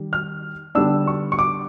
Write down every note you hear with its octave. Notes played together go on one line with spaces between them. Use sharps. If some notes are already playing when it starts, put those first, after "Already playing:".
Already playing: D#3 G3
F6
D3 G3 B3 D4 E6
C#6
C#6
D6